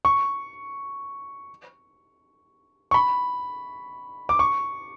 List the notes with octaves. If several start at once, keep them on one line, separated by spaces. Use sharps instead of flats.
C#6
C#6
B5
D6
C#6